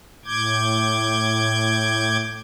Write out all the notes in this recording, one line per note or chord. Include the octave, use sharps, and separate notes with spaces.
A2 D6 G6 G#6